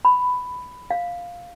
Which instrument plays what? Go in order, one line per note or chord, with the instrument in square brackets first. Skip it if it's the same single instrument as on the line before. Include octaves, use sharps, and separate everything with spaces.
[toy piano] B5
F5